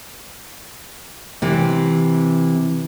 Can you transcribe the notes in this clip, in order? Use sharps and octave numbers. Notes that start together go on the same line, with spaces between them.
C3 E3 C4